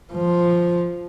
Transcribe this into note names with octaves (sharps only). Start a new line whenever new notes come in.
F3